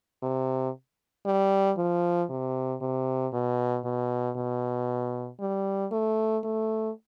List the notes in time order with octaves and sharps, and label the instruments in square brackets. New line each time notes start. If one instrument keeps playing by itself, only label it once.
[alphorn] C3
G3
F3
C3
C3
B2
B2
B2
G3
A3
A3